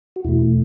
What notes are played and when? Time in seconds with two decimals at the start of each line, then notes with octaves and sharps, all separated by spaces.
0.16 F#4
0.24 E2 B2 A3 E4